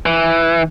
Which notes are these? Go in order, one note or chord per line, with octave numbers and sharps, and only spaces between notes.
E3